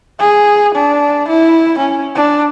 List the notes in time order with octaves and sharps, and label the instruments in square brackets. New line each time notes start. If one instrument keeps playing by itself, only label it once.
[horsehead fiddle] G#4
D4
E4
C#4
D4